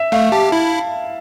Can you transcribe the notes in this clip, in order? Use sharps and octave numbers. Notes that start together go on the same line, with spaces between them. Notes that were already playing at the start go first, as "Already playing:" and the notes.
Already playing: E5
A3 F5
G4 A5
E4